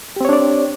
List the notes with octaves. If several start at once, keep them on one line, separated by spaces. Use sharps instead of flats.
C4 D4 G4 C#5 D5